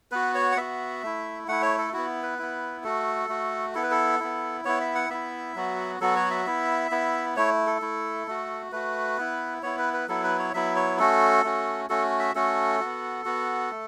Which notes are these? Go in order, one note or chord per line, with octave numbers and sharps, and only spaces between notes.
B3 F#4 B4
C#5
F#5
B3 F#4 E5
A3 E4
A3 E4 F#5
C#5
A4
B3 E4 F#4
B4
B3 E4
A3 F#4 A4
A3 F#4
B3 E4 A4
B4
A4
B3 E4
B3 E4 C#5
E5
F#5
B3 E4 E5
F#3 B3 F#4
F#3 B3 F#4 A4
C#5
E5
B3 E4
B3 E4
A3 E4 C#5
A4
A3 E4
A3 F#4
A3 F#4 B4
B3 E4
B3 E4 C#5
B4
B4
F#3 B3 E4 A4
B4
C#5
F#3 B3 E4 E5
C#5
A3 C#4 F#4 A4
A3 C#4 F#4
A3 C#4 F#4 A4
E5
A3 C#4 F#4 A4
B3 F#4
B3 F#4
A3